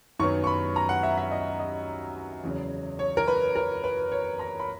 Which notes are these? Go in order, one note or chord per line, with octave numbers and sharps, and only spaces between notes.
F#2 D#3 F#3 B3 C#6
C#6
B5
A#5
F#5
E5
E5
D#5
D#5
E2 C#3 F#3
C#5
A#4
B4
A#4
B4
C#5
A#5
B5